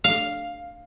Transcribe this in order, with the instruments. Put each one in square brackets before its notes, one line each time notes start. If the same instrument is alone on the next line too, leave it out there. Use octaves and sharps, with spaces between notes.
[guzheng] F5